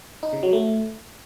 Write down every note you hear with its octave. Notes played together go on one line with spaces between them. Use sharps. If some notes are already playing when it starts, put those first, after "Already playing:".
D#4
C#3
F#3
A3